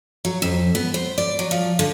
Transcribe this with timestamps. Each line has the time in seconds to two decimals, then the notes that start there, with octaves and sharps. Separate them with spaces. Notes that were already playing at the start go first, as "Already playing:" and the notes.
0.25 F#3
0.42 F2
0.75 B3
0.94 C5
1.18 D5
1.39 F#3
1.51 F3
1.79 D3